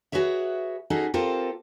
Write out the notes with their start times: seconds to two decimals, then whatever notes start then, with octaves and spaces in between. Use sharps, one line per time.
0.12 F#4 G#4 B4 C#5 E5
0.90 C#4 D#4 F#4 G#4 A4 D#5
1.14 C4 F4 G4 A4 A#4 C5